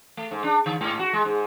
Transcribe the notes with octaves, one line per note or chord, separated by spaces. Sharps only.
A3
G#2
D4
D3
G#2
F#4
G#3
G#2